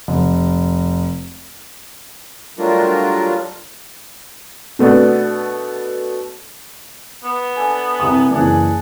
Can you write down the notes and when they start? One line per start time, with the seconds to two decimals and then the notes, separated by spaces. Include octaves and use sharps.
0.08 F1
2.58 F#3 G3 A3 D4 F4 A#4
4.79 B2 A3 B3 D4
7.24 B3
7.56 D4 A4 G#5
8.00 C2 D#6
8.31 F#1 E3 D4 G#4 F#5